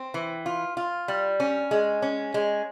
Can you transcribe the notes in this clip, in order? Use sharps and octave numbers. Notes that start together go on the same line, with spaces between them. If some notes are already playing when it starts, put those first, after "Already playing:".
Already playing: C4
E3
F4
F4
G3
C#4
G#3
C#4
G#3